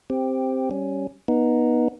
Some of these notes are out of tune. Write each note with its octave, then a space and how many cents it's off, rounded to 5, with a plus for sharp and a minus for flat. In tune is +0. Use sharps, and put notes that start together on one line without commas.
C4 +0 G4 +10
G3 -10 C#4 +0
B3 -25 D#4 +0